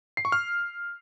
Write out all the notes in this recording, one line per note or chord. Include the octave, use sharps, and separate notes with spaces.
C7
C#6
F6